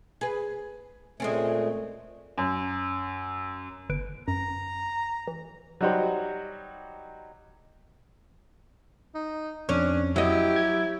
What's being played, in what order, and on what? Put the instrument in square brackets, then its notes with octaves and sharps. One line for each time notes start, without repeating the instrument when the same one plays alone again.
[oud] G#4 B4
[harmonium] A#2 A3 [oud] G#3 C4 C#4
[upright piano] F#2
[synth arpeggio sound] G1 B4 D7
[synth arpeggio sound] F#2 [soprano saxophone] A#5
[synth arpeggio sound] E3
[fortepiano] F#3 G3 D#4 F#4 G4 C5
[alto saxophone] D#4
[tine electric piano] F2 [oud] C#4 [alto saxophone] D4
[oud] F#3 D#5 [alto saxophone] E4 [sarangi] G4
[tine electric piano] G#6